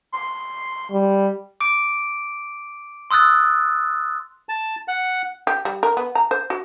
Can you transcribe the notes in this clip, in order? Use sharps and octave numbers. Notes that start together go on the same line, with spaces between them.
C6
G3
D6 D7
C6 D#6 E6 F#6 A6
A5
F#5
G4
G3
A#4
B3
A#5
C5
F#4